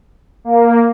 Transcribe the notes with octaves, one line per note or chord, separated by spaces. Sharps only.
A#3